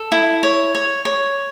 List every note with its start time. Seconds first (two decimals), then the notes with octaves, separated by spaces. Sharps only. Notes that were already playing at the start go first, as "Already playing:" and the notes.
Already playing: A4
0.12 E4
0.43 C#5
0.75 C#5
1.05 C#5